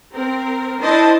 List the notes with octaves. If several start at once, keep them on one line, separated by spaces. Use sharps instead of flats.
C4 A#4
D4 E4 C5 D#5 A5